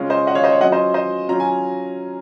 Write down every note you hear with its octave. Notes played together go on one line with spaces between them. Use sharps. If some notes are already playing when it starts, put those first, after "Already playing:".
Already playing: C#3 G#3 C#4 F4
C5 D#5
D#5 F#5
C#5 F5
C5 D#5
C#5
F#3 C#4 F4 D#5 F#5
C5 D#5
C5 D#5
F#3 C#4 F4 A#5
G#5